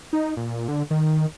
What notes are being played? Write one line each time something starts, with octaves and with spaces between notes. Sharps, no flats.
D#4
A#2
D3
D#3